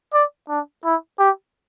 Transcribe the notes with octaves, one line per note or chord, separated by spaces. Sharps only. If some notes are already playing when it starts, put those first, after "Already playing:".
D5
D4
E4
G4